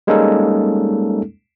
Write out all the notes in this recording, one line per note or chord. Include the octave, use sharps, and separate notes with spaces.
G3 G#3 A#3 C#4 D#4 A4